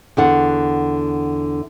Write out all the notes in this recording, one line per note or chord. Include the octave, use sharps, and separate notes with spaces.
E2 D3 F#5